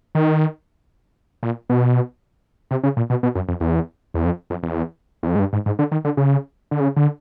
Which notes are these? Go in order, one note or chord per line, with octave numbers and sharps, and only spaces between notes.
D#3
A#2
B2
C3
C#3
A#2
B2
B2
F#2
F2
E2
E2
F2
F2
E2
E2
F2
G#2
G2
G#2
G#2
D3
D#3
D3
C#3
D3
C#3
D3